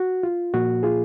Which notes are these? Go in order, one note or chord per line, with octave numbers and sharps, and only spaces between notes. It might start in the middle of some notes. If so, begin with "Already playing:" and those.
Already playing: F#4
F4
A#2 F3 A#3 F#4
F4 G#4